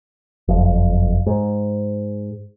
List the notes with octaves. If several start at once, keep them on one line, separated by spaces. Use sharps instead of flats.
F#1 F2
G#2